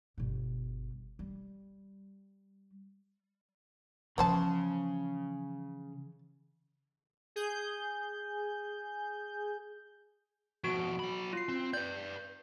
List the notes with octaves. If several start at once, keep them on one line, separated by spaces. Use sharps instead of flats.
G1 B2
G3
C#3 E3 F3 B3 C5 A5
G#4 G6
F2 B2 F#4 D7
F#3 B5
F4 C7
C4
B4 D5 G6